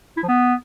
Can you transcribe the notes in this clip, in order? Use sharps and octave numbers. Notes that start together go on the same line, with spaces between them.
E4
F3
B3